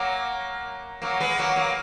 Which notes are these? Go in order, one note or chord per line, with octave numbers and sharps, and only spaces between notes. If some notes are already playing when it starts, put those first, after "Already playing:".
Already playing: F#3 A#3
F#3 A#3
G#3 B3
F#3 A#3
F#3 A#3